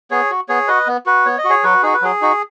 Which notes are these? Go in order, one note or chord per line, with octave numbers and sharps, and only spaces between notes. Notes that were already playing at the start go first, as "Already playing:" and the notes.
B3 G#4 C#5
F#4
B3 G#4 C#5
F#4 B4 D#5
B3
F#4 B4
B3 C#5
D#5
F#4
G#4 C#5
F#3 F#4 B4
D#4 F#4 G#4
B4
F#3 G#4
D#4 F#4